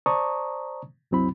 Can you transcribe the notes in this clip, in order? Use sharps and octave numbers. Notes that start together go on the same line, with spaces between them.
C5 D5 A5 A#5 C#6 D#6
C2 F#2 F#3 C4 E4 B5